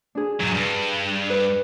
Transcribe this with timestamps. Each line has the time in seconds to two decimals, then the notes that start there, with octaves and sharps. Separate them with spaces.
0.15 D4 G#4
0.40 G#2 F#3
0.54 G2
1.30 B4